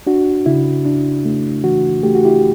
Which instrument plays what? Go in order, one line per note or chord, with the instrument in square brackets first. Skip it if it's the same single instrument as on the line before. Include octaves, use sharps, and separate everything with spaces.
[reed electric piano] D4 F#4
C#3 E4
D4
A3
E3 F#4
A3 G4
F#4
E4 G4